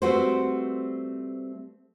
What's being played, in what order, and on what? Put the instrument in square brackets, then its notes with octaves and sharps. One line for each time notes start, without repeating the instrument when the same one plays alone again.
[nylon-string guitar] G3 A3 C4 F#4 B4 C5